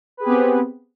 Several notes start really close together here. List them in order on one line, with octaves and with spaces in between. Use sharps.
B4 G#4 G4 B3 C4